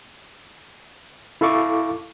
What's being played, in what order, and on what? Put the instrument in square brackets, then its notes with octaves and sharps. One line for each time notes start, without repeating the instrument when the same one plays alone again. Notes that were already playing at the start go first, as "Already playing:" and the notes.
[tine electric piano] E4 A4 F5 C#6 D6